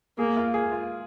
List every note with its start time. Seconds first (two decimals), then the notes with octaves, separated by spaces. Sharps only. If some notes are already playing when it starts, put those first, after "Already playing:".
0.18 A#3 G#4
0.36 F4
0.54 G#4
0.72 F4